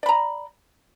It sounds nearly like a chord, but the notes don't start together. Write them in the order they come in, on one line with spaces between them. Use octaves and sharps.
D5 B5 A#5